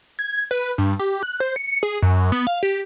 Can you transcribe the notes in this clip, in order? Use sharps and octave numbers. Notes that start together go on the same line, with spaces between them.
G#6
B4
G2
G4
F#6
C5
C#7
G#4
F#2
B3
F5
G4